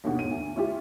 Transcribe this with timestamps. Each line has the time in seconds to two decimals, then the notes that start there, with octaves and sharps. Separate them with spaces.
0.04 G1 D#2 B2 D3 F#4
0.19 G#2 D#7
0.31 D2 D3
0.56 C#4 E4 F4 G4